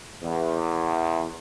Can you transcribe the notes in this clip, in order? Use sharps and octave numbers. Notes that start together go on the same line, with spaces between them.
E2